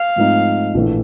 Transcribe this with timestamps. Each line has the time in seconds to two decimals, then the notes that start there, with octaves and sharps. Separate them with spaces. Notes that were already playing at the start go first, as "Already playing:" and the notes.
Already playing: F5
0.16 G#2 F3 A3 C4 D#4
0.74 A#1 A2 E3 A3